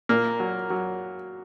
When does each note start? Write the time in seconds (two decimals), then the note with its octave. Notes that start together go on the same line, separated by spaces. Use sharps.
0.09 A#2 A#3
0.40 F#3
0.70 F#3